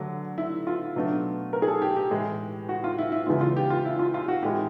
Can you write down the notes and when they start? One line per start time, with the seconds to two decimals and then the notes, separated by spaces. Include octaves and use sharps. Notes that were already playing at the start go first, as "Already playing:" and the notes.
Already playing: D3 F#3 A3 D4
0.38 E4
0.67 F4
0.96 B2 F#3 A3 D4
1.53 A#4
1.62 G#4
1.68 A4
1.82 G4
1.97 G4
2.11 A2 E3 G#3
2.69 F#4
2.84 F4
2.98 E4
3.12 E4
3.27 E2 C#3 E3 G#3 B3 F4
3.41 F4
3.56 G4
3.70 F4
3.85 E4
3.99 F4
4.14 F4
4.28 F#4
4.42 A2 E3 G#3 G4